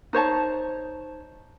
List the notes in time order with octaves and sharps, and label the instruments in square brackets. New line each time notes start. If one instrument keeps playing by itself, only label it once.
[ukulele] D#4 C5 C#5 A5